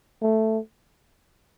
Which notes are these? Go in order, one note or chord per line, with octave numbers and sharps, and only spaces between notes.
A3